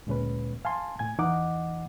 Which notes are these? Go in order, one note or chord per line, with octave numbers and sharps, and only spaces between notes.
D2 A#2 G#3 C#4 B4
F5 G#5 A5 C6
A2 G#5 G#6
E2 E3 D#4 D#5 F#5 D6